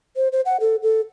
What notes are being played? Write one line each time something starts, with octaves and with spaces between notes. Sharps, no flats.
C5
C5
F#5
A4
A4